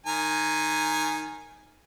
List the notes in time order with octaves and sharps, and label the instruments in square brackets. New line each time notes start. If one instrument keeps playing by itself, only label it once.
[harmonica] D#3 G#5 A#5